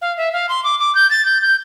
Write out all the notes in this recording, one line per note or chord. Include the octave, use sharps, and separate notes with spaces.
F5
E5
F5
C6
D6
D6
G6
A6
G6
G6